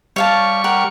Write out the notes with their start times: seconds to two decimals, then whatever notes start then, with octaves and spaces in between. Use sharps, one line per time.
0.16 G3 C#5 F5 A5 C#6
0.64 A#4 F#5 G5